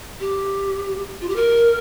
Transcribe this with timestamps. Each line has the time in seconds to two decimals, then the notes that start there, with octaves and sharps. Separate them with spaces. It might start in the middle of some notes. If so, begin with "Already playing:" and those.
0.20 G4
1.21 F4
1.29 G4
1.36 A#4